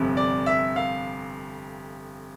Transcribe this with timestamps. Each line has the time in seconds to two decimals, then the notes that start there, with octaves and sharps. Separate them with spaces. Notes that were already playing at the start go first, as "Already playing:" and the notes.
Already playing: G1 F2 C3
0.17 D5
0.46 E5
0.76 F5